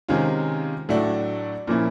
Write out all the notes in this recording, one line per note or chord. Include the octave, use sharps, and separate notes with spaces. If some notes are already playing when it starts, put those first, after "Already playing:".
C3 D#3 G#3 C#4 F4
A2 F#3 A3 D4 F#4
A#2 F3 A#3 C#4 E4